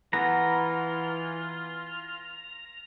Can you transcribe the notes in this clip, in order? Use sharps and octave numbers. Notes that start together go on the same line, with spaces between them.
E3 B3 F4 A#5